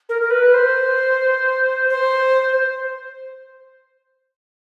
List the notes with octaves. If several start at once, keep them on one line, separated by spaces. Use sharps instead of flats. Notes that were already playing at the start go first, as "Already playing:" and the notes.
A#4
A#4
B4
C5
C5